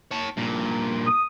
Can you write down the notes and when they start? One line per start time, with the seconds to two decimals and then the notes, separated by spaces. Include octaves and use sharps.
0.11 C#5 A5
0.37 G2 A#2
1.07 D#6